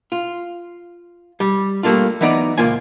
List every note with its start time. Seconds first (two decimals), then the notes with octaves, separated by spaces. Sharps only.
0.12 F4
1.40 G3
1.83 G3 A3 A#3 D4 F4
2.21 E3 F#3 B3 D#4 D5
2.58 C#2 A#2 A#3 F4 C5 G#5